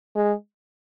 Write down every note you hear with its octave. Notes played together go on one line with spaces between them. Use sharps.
G#3